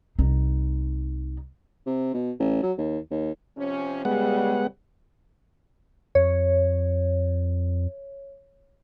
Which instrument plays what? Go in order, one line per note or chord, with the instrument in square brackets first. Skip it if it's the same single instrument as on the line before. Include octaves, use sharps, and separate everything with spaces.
[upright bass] C2 D#4
[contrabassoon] C3
B2
A1
F#3
D#2
D#2
[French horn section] C3 F3 C#4
[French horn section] C#3 G3 [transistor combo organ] G#3 B3 F#5
[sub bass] F2 [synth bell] C#5